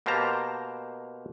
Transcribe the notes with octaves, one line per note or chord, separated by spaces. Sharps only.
B2 A#3 G4 C5 A5 A#5